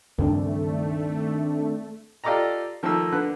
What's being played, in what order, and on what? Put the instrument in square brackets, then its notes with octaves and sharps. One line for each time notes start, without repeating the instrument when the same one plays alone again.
[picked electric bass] C#2 G2 [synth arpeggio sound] D#3 C4 D4 [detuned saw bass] A3
[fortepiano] F4 G4 A4 D5 D#5 A#5
D#3 F3 A3 A#3 E6
D3 B4 F#6